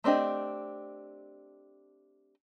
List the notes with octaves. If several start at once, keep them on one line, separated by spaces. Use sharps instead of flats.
A3 C4 D4 G4 D#5